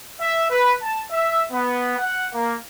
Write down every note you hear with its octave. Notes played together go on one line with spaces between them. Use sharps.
E5
B4
A5
E5
B3
F#5
A#3